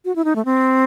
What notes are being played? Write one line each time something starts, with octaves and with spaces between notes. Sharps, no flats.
F#4
E4
D#4
A3
C4